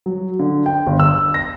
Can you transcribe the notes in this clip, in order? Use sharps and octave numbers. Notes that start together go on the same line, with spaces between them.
F#3
D3
G5
G1
E6
A#6